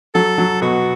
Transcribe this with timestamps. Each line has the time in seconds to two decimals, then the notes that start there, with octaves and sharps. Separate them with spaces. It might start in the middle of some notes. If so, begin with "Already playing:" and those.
0.15 F#3 A4
0.38 F#3
0.62 B2 F#4